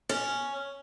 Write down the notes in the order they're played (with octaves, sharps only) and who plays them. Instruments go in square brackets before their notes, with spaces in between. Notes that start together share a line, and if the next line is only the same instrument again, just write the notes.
[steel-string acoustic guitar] C#4